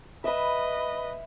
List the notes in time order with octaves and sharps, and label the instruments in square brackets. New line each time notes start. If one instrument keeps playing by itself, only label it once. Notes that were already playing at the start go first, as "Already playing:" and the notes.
[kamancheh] B4 D#5 [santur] E5 B5